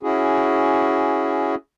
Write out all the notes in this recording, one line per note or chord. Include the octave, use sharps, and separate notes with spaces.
C#4 E4 F#4 G#4